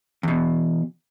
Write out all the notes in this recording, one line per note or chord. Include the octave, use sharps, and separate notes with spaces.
E2 B2